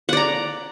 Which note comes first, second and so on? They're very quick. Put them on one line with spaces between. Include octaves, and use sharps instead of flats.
F#5 D5 A#5